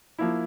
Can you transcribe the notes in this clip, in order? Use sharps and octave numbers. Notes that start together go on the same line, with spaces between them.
F3 A#3 E4